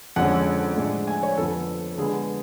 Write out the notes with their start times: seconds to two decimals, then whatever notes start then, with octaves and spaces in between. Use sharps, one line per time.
0.16 F2 D3 G#3 C#4 F#5
0.77 A2 G#3 D4
1.07 G#5
1.23 C#5
1.38 F2 D3 F3 B3 A4
1.98 D3 G#3 B3 G#4